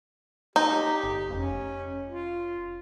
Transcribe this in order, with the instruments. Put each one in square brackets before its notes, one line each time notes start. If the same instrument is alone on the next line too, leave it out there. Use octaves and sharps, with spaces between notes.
[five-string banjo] D#4 [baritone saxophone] G4
[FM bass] G1
[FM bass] F1 [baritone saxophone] C#4
[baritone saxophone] F4